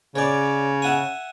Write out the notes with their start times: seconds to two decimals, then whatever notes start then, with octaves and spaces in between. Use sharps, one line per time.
0.16 C#3 C#5 D5
0.82 E5 F#5 G#5